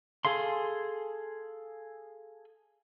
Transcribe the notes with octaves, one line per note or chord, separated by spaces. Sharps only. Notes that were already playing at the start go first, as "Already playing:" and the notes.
G#4 A4 F5 C6